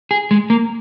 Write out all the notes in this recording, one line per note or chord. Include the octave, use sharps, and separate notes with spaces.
G#4
G#3
A#3